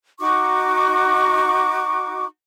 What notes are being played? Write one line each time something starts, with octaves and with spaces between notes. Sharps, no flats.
D#4 F#4 C#6 D6